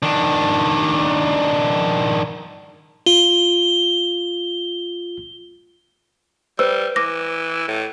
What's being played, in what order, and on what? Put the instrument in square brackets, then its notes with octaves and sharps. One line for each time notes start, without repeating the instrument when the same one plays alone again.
[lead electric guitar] D#3 D4
[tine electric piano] F4 [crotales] G7
[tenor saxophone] G3 [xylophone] B4 C5 E6
[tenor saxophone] E3 [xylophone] B4 D6 A#6
[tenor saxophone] A2